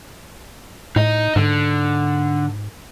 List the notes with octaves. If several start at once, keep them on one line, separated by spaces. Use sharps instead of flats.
A2 D#4 D#5
G#2 D3